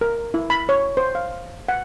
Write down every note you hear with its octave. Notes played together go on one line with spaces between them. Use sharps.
A#4
E4
B5
C#5
C5
F5
F#5